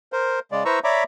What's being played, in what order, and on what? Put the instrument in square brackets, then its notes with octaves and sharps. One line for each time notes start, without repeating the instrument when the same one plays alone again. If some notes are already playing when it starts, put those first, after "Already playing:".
[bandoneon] A#4 C5
C#3 G#3 D5
E4 B4 C5 A#5 C#6 E6
C#5 D5 E5 A#5 B5 D6